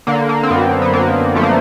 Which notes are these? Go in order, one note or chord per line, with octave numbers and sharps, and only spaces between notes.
D3 A#3
A#3
C4
F#2 B3
B3
F#2 A#3
F3 A3
A#3